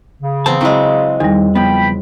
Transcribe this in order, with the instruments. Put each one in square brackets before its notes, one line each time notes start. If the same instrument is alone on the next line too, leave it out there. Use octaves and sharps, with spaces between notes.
[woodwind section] C#3
[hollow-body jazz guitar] E3 B3 A5 [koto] C4
[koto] F#3 G#3 [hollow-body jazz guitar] C4 E4
[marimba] E2 G3 [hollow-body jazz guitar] D#3
[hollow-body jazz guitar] C#2 F3 B3 [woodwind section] G5 B5